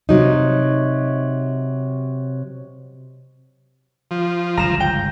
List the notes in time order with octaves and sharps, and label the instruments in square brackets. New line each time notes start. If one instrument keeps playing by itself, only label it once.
[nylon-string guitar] C3 F#3 D#4
[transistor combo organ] F3
[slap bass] G1 C#2 G#2 [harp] A#5 E7
[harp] G5